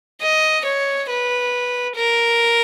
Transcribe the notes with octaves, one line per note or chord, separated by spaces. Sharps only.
D#5
C#5
B4
A#4